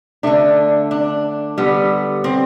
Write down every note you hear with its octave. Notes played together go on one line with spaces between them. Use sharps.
D3 A3 D4
D4
D3 G3 B3
C4